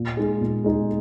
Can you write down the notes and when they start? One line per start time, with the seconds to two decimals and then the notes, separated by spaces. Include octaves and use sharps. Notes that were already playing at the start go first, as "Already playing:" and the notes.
Already playing: A#2
0.17 G#3 D#4 G#4
0.41 A#2
0.64 G#3 D#4 G#4